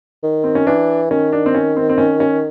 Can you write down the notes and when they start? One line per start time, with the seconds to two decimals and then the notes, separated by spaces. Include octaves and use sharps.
0.23 D#3
0.44 C4
0.55 C#4
0.67 E3 D4
1.11 D#3 C#4
1.33 D4
1.46 C4
1.55 C#4
1.76 C4
1.89 C4
1.98 C#4
2.20 C#4